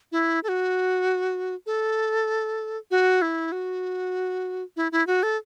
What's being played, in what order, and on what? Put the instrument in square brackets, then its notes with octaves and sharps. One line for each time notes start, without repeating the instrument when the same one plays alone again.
[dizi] E4
A4
F#4
A4
F#4
E4
F#4
E4
E4
F#4
A4